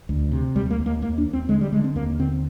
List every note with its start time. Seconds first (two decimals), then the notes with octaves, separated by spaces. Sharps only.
0.09 D2
0.32 C3
0.56 D#2 G3
0.70 A#3
0.79 D#2
0.86 A#3
1.02 D#2 A#3
1.18 D4
1.26 D#2
1.33 C4
1.49 D3 G#3
1.61 G3
1.72 D3 G#3
1.84 C4
1.96 D#2 A#3
2.20 D3 C4